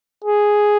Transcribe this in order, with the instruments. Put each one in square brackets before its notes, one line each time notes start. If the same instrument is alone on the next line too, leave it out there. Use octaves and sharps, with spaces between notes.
[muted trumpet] G#4